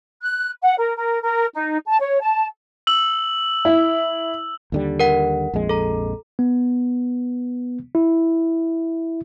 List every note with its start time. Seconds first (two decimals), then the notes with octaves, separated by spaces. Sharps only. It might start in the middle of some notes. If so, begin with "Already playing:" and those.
0.22 F#6
0.62 F#5
0.77 A#4
0.97 A#4
1.23 A#4
1.53 D#4
1.87 A5
2.00 C#5
2.19 A5
2.87 E6 F#7
3.65 E4
4.72 D#2 D3 G3
5.00 A#4 F#5
5.54 A#1 F2 G#3
5.69 A4 A#5
6.39 B3
7.95 E4